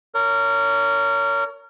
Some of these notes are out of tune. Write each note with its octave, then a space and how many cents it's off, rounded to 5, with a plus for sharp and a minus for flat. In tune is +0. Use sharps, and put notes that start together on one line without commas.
A#4 -20 C#5 +30